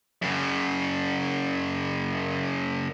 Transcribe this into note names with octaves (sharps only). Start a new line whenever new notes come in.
F#2 C#3